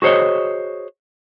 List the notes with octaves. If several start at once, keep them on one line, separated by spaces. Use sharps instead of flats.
F#4 G#4 C5 C#5 D#5